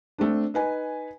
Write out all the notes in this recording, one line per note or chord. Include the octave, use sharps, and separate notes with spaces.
A3 C4 D4
D#4 B4 G#5